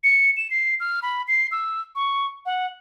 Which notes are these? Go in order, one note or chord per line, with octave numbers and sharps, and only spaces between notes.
C#7
E7
C7
F6
B5
C7
E6
C#6
F#5